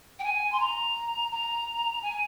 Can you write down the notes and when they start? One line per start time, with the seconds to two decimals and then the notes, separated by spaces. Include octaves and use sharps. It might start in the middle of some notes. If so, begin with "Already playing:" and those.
0.19 G5
0.23 G#5
0.52 C6
0.59 A#5
1.31 A#5
2.02 G#5